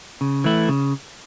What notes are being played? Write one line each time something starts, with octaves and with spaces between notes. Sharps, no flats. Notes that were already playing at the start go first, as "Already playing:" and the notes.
C#3
E3 A3 E4
C#3